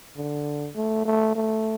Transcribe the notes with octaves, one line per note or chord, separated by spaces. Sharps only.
D3
A3
A3
A3